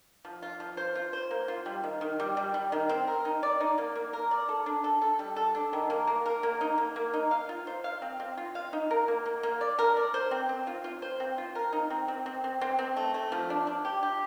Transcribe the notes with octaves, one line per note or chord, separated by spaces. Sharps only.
F3
F4
F3
C5
F4
C5
A#3
F4
G3
D#3
D#3
G3
G3
G3
D#3
C4
A#4
D#4
D5
D#4
A#3
A#3
A#4
D5
A4
D4
A4
A4
G3
A4
D4
D#3
A#3
A#3
A#4
A#3
D#4
A#3
A#3
D#4
F5
F4
C5
F5
C4
C4
F4
F5
D#4
A#4
A#3
A#3
A#3
D5
A#4
D5
C5
C4
C4
F4
F4
C5
C4
F4
A#4
D#4
C4
C4
C4
C4
C4
C4
A3
A3
F3
D4
D4
G4
G4